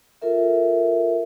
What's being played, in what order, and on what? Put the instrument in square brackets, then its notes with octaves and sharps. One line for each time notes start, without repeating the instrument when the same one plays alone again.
[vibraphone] F4 A4 A#4 E5